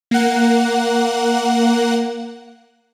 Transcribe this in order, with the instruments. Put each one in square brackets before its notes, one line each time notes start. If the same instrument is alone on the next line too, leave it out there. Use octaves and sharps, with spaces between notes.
[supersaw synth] A#3 F#5